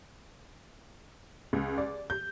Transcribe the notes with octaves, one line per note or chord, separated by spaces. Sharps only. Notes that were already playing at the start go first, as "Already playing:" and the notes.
C#2
D5
G6